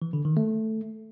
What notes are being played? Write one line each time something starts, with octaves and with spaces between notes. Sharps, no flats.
E3
D3
D#3
A3